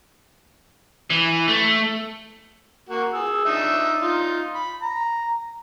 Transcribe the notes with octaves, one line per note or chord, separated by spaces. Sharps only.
E3
A3
A#3 F#4
G#4 E6
D4 D#4 E5
D#4 F4
B5
A#5